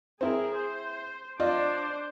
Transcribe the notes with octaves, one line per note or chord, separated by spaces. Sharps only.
C4 E4 G#4 A#4
C5
D4 F4 C5 D5 D#5